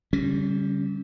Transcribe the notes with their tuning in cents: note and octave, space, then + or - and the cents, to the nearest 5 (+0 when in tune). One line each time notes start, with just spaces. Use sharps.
D3 -45 G3 +0 C#4 -10